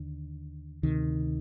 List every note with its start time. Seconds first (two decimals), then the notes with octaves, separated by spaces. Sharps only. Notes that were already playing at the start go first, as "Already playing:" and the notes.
Already playing: D#2 D3
0.83 D2 C3 D#3